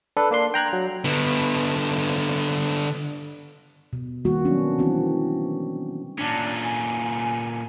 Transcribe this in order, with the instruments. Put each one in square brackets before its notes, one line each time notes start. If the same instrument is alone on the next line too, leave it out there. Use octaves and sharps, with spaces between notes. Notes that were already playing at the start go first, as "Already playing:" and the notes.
[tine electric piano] D4 A4 B4
A#3 D4 C6
G5 A#5 F#6 G#6
F#3
[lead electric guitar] D3 B3
[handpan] B2
D#3 G3 A#3 F#4
F#3 B3 C#4 D4
E3 C4 F#4
[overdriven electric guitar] A#2 C#4 [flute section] D4
[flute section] G#5